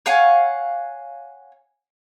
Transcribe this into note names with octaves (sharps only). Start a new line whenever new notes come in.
C#5 F5 F#5 G#5